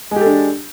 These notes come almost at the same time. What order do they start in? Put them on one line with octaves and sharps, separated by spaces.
G#3 G4 A4 D4